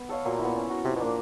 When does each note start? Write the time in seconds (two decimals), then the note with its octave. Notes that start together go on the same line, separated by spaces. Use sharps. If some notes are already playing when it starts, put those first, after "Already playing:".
Already playing: B3
0.09 A4 C#5 F5
0.25 A#2 F#3
0.39 B3 E4
0.55 C#4
0.69 F#4 A#4
0.85 C3 F3
0.96 B2
1.00 A#2 A#3 D4